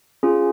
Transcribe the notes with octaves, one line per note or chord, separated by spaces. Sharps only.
C#4 F4 G#4